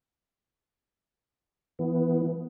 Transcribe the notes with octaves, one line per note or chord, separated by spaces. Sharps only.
E3 B3